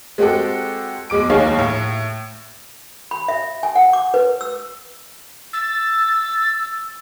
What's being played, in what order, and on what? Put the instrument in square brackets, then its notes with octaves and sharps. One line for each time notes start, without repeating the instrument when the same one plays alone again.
[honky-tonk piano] G#3 C4 F#4 G4 A4
B1 G#3 D6 D7
D#2 G#3 D#4 G#4 C#5 F5
A2
[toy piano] B5
E5
G#5
F#5
D6
B4
E6
[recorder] E6 [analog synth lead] A6